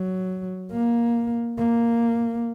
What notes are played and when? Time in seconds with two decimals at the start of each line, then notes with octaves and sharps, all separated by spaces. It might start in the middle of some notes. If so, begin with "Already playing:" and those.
Already playing: F#3
0.72 A#3
1.59 A#3